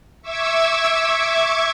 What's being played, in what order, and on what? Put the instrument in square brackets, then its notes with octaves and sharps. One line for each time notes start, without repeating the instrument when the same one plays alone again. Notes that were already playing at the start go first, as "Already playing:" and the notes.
[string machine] E5 C#6 D6 E6 G#6